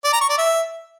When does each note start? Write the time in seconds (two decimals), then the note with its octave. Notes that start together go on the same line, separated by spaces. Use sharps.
0.05 D5
0.13 A#5
0.21 C#6
0.30 D5
0.38 E5